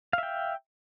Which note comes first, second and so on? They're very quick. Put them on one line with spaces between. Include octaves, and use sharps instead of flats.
F5 E5 G5